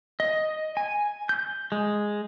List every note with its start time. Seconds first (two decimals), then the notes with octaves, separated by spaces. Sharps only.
0.20 D#5
0.77 G#5
1.29 G6
1.72 G#3